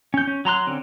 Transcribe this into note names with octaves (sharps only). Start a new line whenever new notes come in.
C#4 G6
C#4
F#3 A#5 C6 F#6
D3 C4 C#4